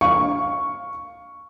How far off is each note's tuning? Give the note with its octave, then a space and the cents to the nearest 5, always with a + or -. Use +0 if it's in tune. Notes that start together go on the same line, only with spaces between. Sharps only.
F5 +10 C#6 +0